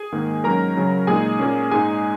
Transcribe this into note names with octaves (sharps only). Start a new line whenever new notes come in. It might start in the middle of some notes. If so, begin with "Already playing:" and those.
Already playing: G#4 G#5
G#2 D#3 A#3
G#2 F#3 C#4 A#4 A#5
C#3 F#3 C#4
A#2 G#3 D#4 G#4 G#5
A#2 A#3 C#4
G#2 G#3 D#4 G#4 G#5